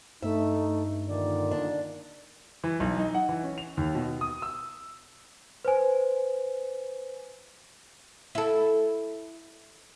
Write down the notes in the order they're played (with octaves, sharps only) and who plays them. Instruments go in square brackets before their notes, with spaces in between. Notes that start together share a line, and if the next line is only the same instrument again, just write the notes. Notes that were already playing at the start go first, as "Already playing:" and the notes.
[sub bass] G2 [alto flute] A3 [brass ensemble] D#4 [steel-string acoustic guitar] E5
[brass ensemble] A#2 D3 D#3 [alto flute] D5
[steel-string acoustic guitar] D4
[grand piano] E3
B1
D#4
F#5
E3
C#4
F7
D#2
B2
D#6
E6
[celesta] B4 C5 G#5
[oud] E4 A4